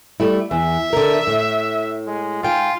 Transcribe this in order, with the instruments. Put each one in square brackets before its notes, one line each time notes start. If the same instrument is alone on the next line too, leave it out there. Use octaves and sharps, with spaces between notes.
[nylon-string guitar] G3 A3 E4
[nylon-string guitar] E2 [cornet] E5
[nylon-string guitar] D3 A#4
A2
[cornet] G#3
[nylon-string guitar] G#2 G5 [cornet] F4